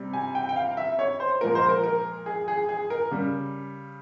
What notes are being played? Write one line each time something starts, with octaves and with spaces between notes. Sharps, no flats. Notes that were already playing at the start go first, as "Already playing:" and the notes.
Already playing: C3 G3
G#5
G5
G5
F5
E5
C#5
C5
A#2 F3 G#3 A#4
C5
A#4
A#4
G#4
G#4
G#4
A#4
C#3 G3